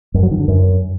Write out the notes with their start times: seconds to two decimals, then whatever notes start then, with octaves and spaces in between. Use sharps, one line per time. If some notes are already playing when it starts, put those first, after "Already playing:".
0.14 F#2
0.23 F#3
0.31 D#3
0.39 D3
0.48 F#2